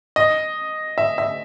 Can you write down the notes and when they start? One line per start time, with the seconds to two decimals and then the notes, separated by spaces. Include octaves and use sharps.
0.16 D#5
0.98 E5
1.18 E5